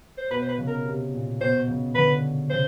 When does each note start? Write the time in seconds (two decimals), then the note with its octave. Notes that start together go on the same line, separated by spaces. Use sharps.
0.18 C5
0.31 B2 B4
0.42 C5
0.48 B4
0.58 C#3
0.67 A#4
0.85 C3
1.12 A#2
1.40 B2 C5
1.68 C#3
1.95 D3 B4
2.50 C#3 C5